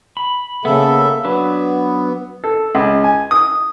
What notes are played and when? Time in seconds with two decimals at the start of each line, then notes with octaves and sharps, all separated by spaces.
0.17 B5
0.65 C#3 A#3 B3 A4 E5
1.25 F#3 B3 D4 B4
2.44 A4
2.75 C#2
3.04 G#5
3.31 D#6